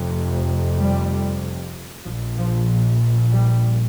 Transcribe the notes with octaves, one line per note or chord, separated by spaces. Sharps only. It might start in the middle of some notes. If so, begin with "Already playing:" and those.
Already playing: F1 F2 C3
G3
A#1 F3
A#2
F3
G3